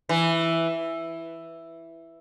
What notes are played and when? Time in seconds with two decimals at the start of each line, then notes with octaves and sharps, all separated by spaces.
0.09 E3